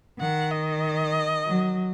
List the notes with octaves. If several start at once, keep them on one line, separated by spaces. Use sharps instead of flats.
D#3 F#5
D#5
F#3